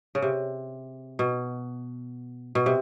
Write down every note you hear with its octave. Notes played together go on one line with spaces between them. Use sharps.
C#3
C3
B2
B2
C3